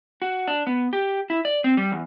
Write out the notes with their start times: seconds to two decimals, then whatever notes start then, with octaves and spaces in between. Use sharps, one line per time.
0.22 F#4
0.48 D4
0.67 B3
0.93 G4
1.30 E4
1.45 D5
1.64 C4
1.77 G3
1.92 E2